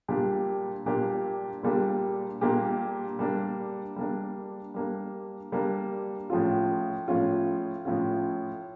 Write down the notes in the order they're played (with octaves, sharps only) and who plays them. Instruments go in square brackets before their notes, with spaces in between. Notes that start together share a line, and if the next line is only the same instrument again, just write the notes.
[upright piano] A#2 G3 A#3 D4 G4
A#2 G3 A#3 D4 G4
A#2 G3 A#3 D4 G4
A#2 G3 A#3 D4 G4
G3 A#3 D4
G3 A#3 D4
G3 A#3 D4
G3 A#3 D4
A2 F3 C#4 F4
A2 F3 C#4 F4
A2 F3 C#4 F4